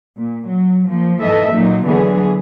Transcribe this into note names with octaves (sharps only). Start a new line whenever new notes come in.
A#2
F#3
F3 A#3
G#2 E3 A4 D#5 E5
A#2 F#3 A#3 D#4
D3 E3 F#3 B3 G#4